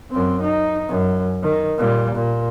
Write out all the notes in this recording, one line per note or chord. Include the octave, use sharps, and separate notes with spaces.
F#2 C4
D#4
F#2
D#3
A#2 G3
A#2